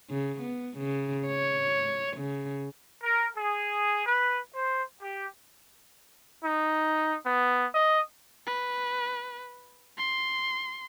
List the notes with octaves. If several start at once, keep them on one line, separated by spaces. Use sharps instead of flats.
C#3
B3
C#3
C#5
C#3
A#4
G#4
B4
C5
G4
D#4
B3
D#5
B4
C6